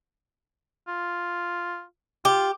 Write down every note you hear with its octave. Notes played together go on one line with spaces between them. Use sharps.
F4
F4 G4